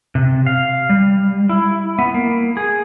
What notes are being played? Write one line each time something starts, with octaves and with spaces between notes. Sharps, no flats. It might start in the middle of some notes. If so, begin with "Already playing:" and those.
C3
F5
G3
E4
B3
A#3
G#4